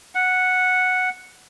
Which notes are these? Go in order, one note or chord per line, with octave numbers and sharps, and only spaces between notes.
F#5